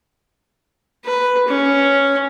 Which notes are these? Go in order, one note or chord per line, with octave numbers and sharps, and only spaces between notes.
B4
C#4